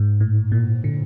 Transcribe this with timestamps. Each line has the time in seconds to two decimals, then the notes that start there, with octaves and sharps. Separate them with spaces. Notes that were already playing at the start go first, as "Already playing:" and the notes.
Already playing: G#2
0.20 A2
0.52 A#2
0.84 D3